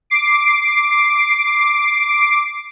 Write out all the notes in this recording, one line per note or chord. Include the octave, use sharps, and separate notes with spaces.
D6 C7 D7